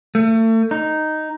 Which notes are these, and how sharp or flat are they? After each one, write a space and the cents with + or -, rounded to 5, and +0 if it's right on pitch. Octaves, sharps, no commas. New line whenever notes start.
A3 +35
D#4 -5